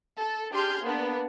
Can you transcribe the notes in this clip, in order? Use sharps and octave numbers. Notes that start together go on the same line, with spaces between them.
A4
D4 G4 G#4 C6 F6 G6
A#3 B3 D4 B4